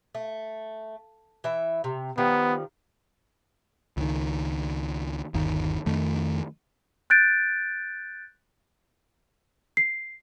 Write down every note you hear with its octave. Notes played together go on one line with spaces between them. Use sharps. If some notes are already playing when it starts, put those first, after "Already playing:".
A3
E3 E5
C3
D#3 F3 G3 B3
C#2 D#3
G1 D#2 D#3
F2 D#3 A3
F#6 G6 A6 D7
C7